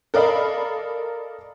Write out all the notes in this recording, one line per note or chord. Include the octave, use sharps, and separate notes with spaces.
A4 A#4 D5 D#5 F5 B5